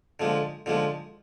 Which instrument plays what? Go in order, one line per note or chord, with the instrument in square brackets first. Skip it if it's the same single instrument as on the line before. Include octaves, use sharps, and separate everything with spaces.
[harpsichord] D3 F3 G#3
D3 F3 G#3